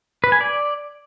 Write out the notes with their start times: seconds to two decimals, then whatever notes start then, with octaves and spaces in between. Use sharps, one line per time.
0.24 B4
0.32 G#5
0.41 D5